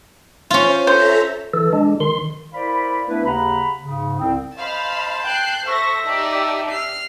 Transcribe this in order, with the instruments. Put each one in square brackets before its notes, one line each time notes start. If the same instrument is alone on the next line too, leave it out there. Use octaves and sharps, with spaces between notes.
[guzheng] C#4 F4 [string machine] C5
[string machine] A4 E5 A#5 [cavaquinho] C5
[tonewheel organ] E3 A4
G#3 D4
D#3 C6
[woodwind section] E4 A#4 C5 D5 F5 B5
A3 B3 D4 E4 B4
D#2 C#3 F#5 A#5 B5
G#2 C#3
C2 C4
[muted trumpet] C5 [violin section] D#5 F5 B5 [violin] A5
[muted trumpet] G5 [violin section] F#6 G6 C7
[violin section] A4 C5 A#6 [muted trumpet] E5 [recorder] C#6
[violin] D#4 [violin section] G4 D5 [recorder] A5
[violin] F6 C7